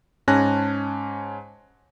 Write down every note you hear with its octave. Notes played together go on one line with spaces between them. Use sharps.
G#2 C#4 G#5 A5 F#6 A#6